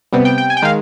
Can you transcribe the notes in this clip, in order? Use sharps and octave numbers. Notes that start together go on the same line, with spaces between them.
C3 G3 B3
G5
G5
G#5
G5
D#3 G#3 F5